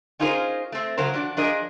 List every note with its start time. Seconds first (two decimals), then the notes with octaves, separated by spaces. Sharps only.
0.19 C#4 D#4 F4 G#4 A#4 C5
0.72 A3 C4
0.98 C#3 F#3 A#4 C5
1.14 F3 D4 F#4
1.37 F3 D4 G#4 A#4 D#5